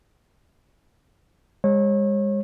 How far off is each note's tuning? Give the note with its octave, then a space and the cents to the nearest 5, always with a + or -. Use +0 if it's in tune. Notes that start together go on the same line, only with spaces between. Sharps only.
G#3 -30 C#5 -30